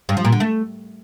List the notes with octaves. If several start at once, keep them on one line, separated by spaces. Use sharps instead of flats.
G2
F3
A#2
D3
A3